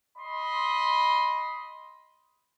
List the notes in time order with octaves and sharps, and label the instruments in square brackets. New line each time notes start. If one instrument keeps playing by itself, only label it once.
[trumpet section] D#5 B5 C6